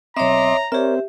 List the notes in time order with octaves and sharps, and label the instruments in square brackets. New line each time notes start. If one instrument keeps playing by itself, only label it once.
[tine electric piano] B1 C4 [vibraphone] C#5 E5 [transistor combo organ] D#5 C6 D6 [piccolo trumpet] A#5
[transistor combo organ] C4 [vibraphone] G4 E5 [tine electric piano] A#4 C#5 D5